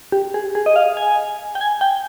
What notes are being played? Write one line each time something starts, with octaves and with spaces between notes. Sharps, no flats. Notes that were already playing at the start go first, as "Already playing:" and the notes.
G4
G#4
G#4
D#5
F5
G#5
G5
G#5
G5